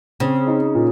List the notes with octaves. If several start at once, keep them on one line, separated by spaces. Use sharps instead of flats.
C#3 C4
D#4
A#2